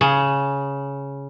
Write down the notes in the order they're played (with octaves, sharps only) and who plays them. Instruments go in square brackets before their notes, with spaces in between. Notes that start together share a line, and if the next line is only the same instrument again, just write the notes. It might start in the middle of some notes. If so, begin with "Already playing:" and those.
[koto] C#3